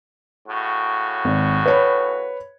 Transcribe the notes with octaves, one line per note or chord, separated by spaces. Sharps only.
A2 C#3 F#4
G#1
B4 C#5 B5